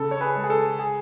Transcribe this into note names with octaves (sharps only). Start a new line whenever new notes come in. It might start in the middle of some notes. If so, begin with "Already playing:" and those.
Already playing: C#3 A4
C#5
G#4 B4
G#3
G#4
A4
G#4